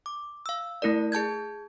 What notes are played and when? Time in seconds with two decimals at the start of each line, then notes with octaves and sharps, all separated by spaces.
0.06 D6
0.46 F5 E6
0.82 A3 E4 A#4 D5
1.12 G#4 A5 G6 G#6